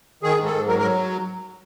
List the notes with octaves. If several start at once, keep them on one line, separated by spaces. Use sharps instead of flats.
D#3 G#4
G#2
A4
G#2
F#3 A#4
A#4
F#3